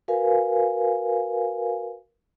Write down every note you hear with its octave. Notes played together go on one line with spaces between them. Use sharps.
F#4 A#4 B4 F5 G#5